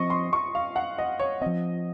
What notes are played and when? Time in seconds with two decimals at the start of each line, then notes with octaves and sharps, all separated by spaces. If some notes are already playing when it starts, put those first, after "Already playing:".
Already playing: F3 C4 D#5 C#6
0.10 C6
0.33 C#6
0.55 F5
0.76 F#5
0.98 D#5
1.19 C#5
1.41 F3 C4 D#5